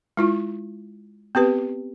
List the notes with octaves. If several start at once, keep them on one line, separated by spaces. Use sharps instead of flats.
G#3 E4 F4
B3 C4 G4 B4